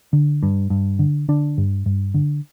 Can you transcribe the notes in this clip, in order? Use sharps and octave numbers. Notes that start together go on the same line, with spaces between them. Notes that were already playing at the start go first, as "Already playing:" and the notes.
D3
G2
G2
D3
D3 D4
G2
G2
D3